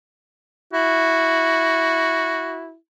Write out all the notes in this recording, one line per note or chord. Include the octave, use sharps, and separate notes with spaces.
E4 F#4